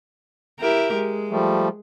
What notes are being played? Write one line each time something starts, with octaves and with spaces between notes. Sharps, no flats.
E4 G4 A#4
G#3
F3 G3 A3